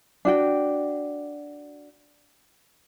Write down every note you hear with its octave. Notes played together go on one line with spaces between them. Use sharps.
D4 F#4 G5